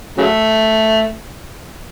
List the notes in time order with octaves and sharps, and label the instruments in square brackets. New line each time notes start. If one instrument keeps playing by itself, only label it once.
[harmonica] C#3 F#3 A3